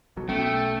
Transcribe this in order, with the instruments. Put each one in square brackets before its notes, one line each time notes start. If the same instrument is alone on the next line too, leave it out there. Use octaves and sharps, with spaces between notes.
[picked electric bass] B1 B2 F#3
[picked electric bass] B1 B3 C#4 [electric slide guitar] A3 [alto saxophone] G5